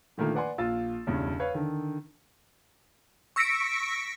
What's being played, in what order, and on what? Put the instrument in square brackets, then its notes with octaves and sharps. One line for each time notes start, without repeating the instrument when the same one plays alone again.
[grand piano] A#2 D3 D#3 F3 A3 A#3
B4 D5 F#5 G#5 C6
A#1 F4 E6 A6
E1 E2 G2 C#3
B4 C#5 F5
D3 D#3
[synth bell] C#6 E6 A#6 B6 C#7 D7